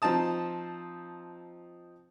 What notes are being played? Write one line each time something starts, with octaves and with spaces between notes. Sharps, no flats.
F3 C4 D#4 A5 D#6